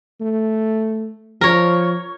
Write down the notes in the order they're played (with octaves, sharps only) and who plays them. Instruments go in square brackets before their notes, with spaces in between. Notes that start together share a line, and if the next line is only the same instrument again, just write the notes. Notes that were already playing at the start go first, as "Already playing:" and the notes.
[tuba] A3
[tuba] F3 [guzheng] A#4 C#5